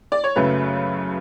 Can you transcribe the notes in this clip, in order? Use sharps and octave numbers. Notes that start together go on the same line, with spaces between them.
D5
C#5
F#2 C#3 F#3 A3 B4